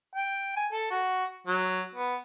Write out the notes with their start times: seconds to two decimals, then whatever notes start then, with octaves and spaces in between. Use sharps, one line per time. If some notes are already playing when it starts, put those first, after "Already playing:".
0.16 G5
0.57 G#5
0.72 A4
0.90 F#4
1.47 F#3
1.95 B3